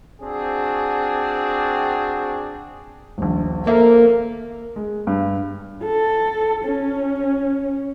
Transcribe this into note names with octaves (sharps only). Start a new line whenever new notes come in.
C4 D4 F#4 G#4
D#1 A#1
A#3 A4 A#4 C5 E5
G#3
G2
A4
C#4